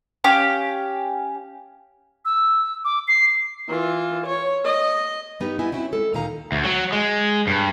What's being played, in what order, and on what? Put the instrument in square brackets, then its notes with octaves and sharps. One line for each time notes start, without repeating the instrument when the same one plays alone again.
[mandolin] C#4 G4 F5
[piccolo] E6
D6
C7
[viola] E3 F4
C#5
D#5
[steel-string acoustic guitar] G2 B3 D#4 G4
B3 E4 D#5 G#5
C4 C#4 E4 F#4
G#3 A4
D2 A#2 D#3 D#4 F5 A#5
[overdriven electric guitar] D2
F#3
G#3
G2